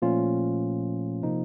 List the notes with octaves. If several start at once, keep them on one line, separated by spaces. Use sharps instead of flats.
A#2 F3 A3 C#4 F4
C3 F3 A#3 D#4